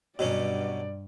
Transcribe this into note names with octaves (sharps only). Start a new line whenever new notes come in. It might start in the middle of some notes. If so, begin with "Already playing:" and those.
G2 B2 F#3 C#4 D5